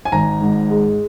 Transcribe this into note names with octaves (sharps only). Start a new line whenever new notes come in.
G#5
G#1 A#5
G#2
G#3